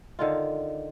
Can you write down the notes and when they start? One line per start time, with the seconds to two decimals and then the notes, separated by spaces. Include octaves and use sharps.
0.19 D3 D#3 F4